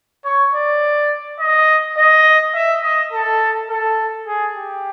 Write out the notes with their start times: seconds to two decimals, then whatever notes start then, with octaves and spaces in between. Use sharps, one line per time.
0.25 C#5
0.54 D5
1.40 D#5
1.97 D#5
2.55 E5
2.83 D#5
3.12 A4
3.70 A4
4.27 G#4
4.56 G4